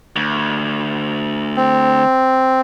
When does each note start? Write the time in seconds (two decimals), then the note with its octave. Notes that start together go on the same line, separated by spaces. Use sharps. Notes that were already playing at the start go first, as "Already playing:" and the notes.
0.16 D2
1.57 C4